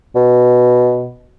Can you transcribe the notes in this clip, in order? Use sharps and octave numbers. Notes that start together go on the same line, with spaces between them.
B2